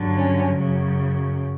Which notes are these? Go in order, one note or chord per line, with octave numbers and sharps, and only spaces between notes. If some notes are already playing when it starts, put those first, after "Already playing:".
Already playing: G2 D3 F#3
C#4
F#2 C#3 F#3